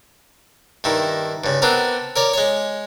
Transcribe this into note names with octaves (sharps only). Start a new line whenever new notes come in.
G2 D#3 E4
G2 C#3
B3 C4 D4 A#4
A#4 C#5 D5
G#3 C#5